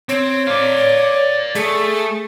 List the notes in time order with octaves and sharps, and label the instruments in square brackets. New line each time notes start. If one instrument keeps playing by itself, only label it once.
[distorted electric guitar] C4 [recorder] C#5
[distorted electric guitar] D5 F5
[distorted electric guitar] A3 [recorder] G#4